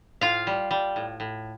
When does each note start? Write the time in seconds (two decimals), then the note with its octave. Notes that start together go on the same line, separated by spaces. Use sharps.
0.21 A2 F4 F5
0.47 G3
0.71 G3
0.96 A2
1.20 A2